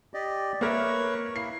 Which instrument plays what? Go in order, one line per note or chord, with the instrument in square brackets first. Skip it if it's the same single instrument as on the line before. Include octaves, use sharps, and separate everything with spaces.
[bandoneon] G4 D5 D#5
[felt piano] A#3 A#4 E5 [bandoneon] B4 C#5 C#6
[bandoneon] A#3 E4 [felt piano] C7